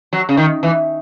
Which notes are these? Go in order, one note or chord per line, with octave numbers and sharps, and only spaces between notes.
F#3
C#3
D#3
E3